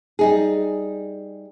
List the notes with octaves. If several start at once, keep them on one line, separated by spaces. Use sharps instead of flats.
G3 D#4 G#4